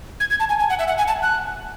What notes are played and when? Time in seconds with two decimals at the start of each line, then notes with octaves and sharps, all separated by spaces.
0.20 G#6
0.30 G#6
0.40 A5
0.49 G#5
0.59 G#5
0.70 F#5
0.79 E5
0.88 F#5
0.98 G#5
1.08 A5
1.22 F#6